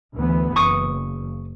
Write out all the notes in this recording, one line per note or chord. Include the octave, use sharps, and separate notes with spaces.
D2 E3 B3
F#1 C#6 D#6